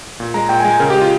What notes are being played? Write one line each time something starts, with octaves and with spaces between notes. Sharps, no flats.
A#2
G#3 A#5
A#2 G5
G#5
G#3
G#5
C#3 A#4
G4
G#3
F4